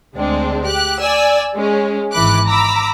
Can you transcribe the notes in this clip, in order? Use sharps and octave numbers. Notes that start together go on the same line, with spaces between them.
D2 G#3 C4 D4
G4 F#6
D5 G#5 E6
G#3 C#4
G#1 E3 B5 D6 F#6
A#5 B5 D6 E6